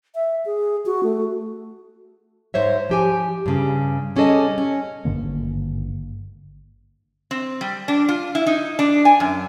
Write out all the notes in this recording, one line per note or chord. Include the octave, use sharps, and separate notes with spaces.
E5
G#4
F#4
A3
G#2 C5 C#5 E5
F3 G4 G#5
G2 C#3
G3 C#4 G#4 A4 D#5
C#4
G#1 G2 D3 A#3
C4
G3
D4
F4
E4
D#4
D4
G#5
F#2